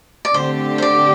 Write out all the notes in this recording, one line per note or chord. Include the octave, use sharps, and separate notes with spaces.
D5
D3 A3 C4 G4 C5
C5
D5